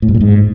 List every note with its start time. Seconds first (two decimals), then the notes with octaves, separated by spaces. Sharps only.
0.02 A2
0.08 G2
0.14 A#2
0.21 G#2